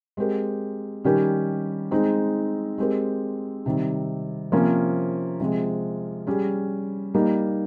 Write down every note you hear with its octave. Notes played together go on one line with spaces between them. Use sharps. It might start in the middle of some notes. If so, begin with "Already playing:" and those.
G#3 C4 G4 A#4
D#3 G3 C#4 G4 A#4
G#3 C4 D#4
G#3 C4 G4 A#4
C3 D#3 G3
C3 F3 A#3 C#4
C3 F3 G#3
G3 C#4 G#4
G3 A#3 D#4